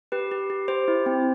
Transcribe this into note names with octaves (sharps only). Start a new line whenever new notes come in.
G4 B4
G4
G4
G4 C5
E4
C4